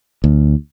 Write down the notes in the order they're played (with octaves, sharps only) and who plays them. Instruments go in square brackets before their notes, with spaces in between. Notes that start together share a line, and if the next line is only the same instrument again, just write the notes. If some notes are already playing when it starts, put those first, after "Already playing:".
[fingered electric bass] D2